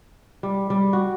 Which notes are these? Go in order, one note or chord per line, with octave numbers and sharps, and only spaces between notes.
G3
G3
F#4